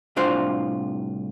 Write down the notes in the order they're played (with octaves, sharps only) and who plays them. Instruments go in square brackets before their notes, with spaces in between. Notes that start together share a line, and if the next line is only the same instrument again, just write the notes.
[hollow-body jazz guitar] C2 A2 D4 F4 C5